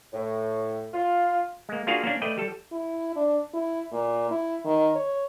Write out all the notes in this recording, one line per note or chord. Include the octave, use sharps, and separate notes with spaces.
A2
F4
G#3 A#3
A#3 D4 F4 F#4 G#4 F5
A#3 C#4 D4
A3 B4 D5 D#5 G5
G3 A4
E4
D4
E4
A#2
E4
D#3
C#5